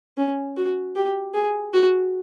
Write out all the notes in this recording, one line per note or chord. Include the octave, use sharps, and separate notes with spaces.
C#4
F#4
G4
G#4
F#4